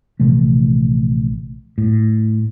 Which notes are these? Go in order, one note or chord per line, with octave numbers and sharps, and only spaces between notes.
A#1 C3 E3 A3
A2